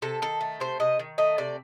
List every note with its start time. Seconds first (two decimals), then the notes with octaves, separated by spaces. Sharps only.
0.02 C3 A4
0.22 D#3 A4
0.41 A3
0.60 C3 C5
0.80 C3 D#5
0.99 D#3
1.18 A3 D#5
1.38 C3 D5